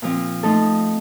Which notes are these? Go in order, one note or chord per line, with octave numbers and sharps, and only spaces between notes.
A#2 F3 C4
F3 A3 D#4 A4